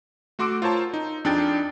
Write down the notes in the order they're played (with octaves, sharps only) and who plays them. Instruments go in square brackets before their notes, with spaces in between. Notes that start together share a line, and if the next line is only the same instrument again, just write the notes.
[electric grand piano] A3 F#4 C6 D6 E6 D7
F4 A#4 C5 C#5 A5 C6
D#4
F2 D4 D#4 G#4 G5 A6